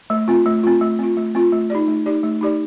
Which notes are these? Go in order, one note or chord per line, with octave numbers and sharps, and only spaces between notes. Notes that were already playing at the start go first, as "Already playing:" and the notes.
A3
C4 F4
A3
C4 F4
A3
C4 F4
A3
C4 F4
A3
D#4 G4 D5
A3
D#4 G4 D5
A3
D#4 G4 D5